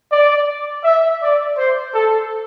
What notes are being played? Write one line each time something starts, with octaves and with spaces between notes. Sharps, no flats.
D5
E5
D5
C5
A4